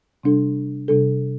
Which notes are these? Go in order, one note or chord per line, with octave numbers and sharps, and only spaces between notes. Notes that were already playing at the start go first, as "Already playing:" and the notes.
C3 G3 D4 A4
C3 G3 D4 A4